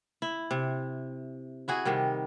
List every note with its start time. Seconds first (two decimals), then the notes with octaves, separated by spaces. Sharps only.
0.22 E4
0.51 C3
1.68 E4 F#4 G#4
1.85 C3 D#3 G3